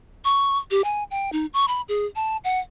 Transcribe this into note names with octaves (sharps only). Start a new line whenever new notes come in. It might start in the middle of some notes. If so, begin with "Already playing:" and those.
C#6
G4
G#5
G5
D#4
C#6
B5
G#4
A5
F#5